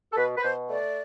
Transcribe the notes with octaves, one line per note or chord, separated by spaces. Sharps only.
A4
B2 B4
B4
B2 C5
A3 D5